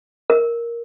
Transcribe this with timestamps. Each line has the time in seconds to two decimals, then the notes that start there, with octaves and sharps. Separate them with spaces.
0.30 A#4